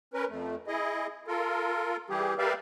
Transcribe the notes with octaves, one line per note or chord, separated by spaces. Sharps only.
C#4 A#4 B4
F2 A3
E4 G#4 D#5
F4 A4 A#4
E3 G3 G4 G#4
G4 A#4 B4 D5 E5 F5